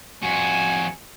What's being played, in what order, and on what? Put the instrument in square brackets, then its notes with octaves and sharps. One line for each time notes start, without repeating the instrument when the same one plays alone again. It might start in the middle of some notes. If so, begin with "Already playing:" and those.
[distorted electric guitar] F2 F#4 [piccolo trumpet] G#5